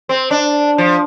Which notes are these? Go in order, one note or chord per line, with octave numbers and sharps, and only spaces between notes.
C4
D4
F3